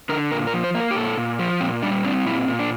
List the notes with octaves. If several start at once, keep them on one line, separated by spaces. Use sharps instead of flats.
D3 A#4
A#2 A#4
A#4
F3
C5
A#3
A#4
G4
A#2 A4
A#2
F3
A#2 C4
G3 D4
C4 D4
A#2 E4
A#2
D4